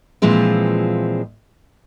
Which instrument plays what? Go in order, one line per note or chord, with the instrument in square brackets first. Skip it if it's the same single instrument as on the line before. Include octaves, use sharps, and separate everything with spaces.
[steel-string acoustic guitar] A#2 E3 F3 G#3 C4